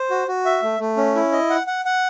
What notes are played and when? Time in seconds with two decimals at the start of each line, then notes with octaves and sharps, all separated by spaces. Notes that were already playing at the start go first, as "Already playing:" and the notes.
Already playing: C5
0.10 F#4
0.28 F#4
0.45 E5
0.63 A3
0.79 A3
0.97 C#4
1.15 E4
1.32 D#5
1.50 F#5
1.67 F#5
1.85 F#5